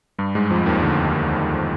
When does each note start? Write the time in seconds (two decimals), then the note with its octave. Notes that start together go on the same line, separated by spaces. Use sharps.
0.19 G2 G3
0.35 G#2 G#3
0.50 F2 F3
0.66 D#2 D#3
0.83 D2 D3